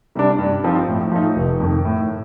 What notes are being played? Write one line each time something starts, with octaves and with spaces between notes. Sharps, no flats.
C3 G3 D4
G2
F3 C4 D#4
A2
F3 A3 D#4
F1
F2 D#3
A2